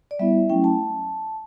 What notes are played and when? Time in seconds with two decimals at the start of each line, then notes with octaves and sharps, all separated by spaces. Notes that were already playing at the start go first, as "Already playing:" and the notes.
0.11 D5
0.19 G3 B3 E4 E5
0.49 F#3 A3 C#4 E4 G5
0.64 A5